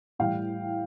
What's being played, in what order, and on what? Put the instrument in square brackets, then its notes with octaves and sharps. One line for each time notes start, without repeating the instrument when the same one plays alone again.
[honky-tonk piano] A2 E3 G3 F5 G5